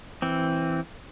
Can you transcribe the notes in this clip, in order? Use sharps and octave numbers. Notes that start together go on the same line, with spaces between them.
E3 C4